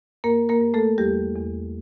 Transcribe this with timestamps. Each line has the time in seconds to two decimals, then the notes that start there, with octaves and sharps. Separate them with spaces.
0.24 G2 A#3 A#4
0.49 A#3 A#4
0.61 G2
0.74 A3 A4
0.98 E2 G3 G4
1.36 E2